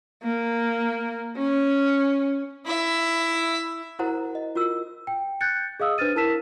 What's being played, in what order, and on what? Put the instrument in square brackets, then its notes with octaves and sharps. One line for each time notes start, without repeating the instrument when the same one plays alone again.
[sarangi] A#3
C#4
[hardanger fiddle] E4 E5
[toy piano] E4 F#4 A#4 C5 F#5 A#5
D#5
F4 F#4 A#4 E6
[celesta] G5
F#6 G6 A6 C#7
G#4 D#5 F5 D#6 E6
D4 B4 C5 F6 A6 D#7
E4 A#4 A5 E6 B6 E7